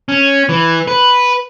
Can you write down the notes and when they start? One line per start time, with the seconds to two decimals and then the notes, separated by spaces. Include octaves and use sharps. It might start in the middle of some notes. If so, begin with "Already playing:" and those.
0.09 C#4
0.49 E3
0.87 B4